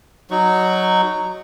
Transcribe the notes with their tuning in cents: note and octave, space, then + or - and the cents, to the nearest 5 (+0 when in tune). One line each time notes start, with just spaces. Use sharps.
F#3 +0 D#4 -10 C#6 +0